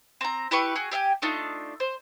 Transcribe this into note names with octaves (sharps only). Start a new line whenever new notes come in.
C4 A#5
E4 G4 B4 C#6
F#4 G#4
G4 E5 G5 G#5
A3 D4 D#4 F4
C5